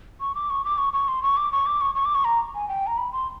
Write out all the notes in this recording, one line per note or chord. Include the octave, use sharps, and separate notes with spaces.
C#6
D6
C#6
D6
C#6
C#6
C6
C#6
D6
C#6
D6
C#6
C#6
D6
C#6
A#5
G#5
G5
A#5
B5
C6